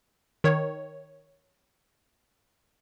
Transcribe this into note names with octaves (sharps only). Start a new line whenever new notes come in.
D#3 C#5